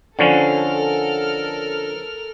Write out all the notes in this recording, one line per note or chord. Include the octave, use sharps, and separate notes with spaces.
D3 F3 C#4 A4 A#4 F6